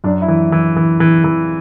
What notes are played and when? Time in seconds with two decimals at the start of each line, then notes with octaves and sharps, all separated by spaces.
0.04 F#2 D4
0.22 E4
0.28 E3
0.52 E3
0.77 E3
1.00 E3
1.24 E3